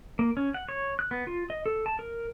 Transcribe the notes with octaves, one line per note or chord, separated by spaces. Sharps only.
A#3
C#4
F#5
C#5
F#6
B3
F4
D#5
A4
A5
A#4